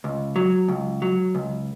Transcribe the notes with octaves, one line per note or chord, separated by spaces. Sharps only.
C#2
F#3
C#2
F#3
C#2